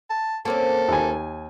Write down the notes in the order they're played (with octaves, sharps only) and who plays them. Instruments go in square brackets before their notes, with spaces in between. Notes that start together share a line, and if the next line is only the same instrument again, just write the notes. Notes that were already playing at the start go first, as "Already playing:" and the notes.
[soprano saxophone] A5
[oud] A#3 C4 C#4 [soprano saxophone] A4
[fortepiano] D#2 G#5